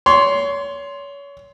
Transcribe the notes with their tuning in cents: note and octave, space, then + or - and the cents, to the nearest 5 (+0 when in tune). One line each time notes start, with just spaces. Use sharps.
C#5 +30 C6 +0